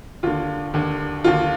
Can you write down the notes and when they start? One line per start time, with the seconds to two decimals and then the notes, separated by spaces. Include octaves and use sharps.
0.23 D#2 D3 F4
0.74 D#2 D3
1.24 D#2 D3 F4